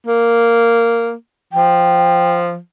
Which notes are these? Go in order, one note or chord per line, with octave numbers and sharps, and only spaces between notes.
A#3
F3 G5